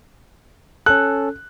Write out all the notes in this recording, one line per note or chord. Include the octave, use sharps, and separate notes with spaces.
C#4 A4 F#6